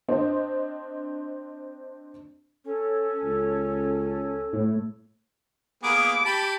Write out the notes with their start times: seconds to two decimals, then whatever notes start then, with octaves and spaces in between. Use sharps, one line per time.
0.08 C4 D4 C5 D#5
2.65 C#4 A4 C#5
3.23 C#2
4.53 A2
5.83 A#3 B3 G#4 D6
6.25 G4 A5 B5